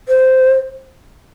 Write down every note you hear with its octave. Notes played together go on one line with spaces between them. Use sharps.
C5